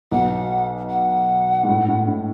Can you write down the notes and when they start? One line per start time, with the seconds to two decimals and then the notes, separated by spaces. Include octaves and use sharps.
0.11 B1 B2 F#5
0.90 F#5
1.63 G#2
1.68 A2
1.88 A2
2.08 A2